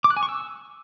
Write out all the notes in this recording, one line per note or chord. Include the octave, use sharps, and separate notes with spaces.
D6
F#6
G#5
C#6
E6